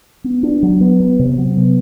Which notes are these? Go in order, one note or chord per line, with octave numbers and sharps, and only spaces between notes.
B3
D4
F#3
B3
B3
C3
F#3
B3